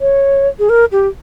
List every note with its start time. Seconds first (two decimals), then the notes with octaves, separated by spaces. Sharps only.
0.01 C#5
0.59 G#4
0.69 A#4
0.92 G4